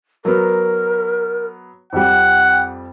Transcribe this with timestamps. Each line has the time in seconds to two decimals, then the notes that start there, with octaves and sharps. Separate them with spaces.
0.25 F#3 B3 A#4
1.93 F2 G3 F#5 G5